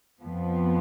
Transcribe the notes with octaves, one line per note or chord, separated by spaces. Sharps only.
F2 F3 B3